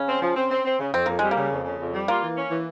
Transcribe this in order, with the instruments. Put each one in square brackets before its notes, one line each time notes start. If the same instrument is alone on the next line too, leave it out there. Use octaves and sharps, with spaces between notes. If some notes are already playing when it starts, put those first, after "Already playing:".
Already playing: [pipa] C#3 C#4
[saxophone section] C4
F3
C4
C4
C4
C#3
[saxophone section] F2 [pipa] C4
[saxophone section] F2 [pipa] A#3
[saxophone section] G3 [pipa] G#3
[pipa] A#3
[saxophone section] C#3
F2
C#3
F2
G3
[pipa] A#3 [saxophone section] F4
[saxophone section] E3
C#4
E3